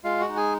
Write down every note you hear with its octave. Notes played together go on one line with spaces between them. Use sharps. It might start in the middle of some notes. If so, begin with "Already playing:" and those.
G#3 F4 F5
F#4 F#5
D#4
G#4 G#5